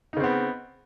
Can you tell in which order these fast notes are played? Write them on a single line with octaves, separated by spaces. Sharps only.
D#4 C#3 C4 B3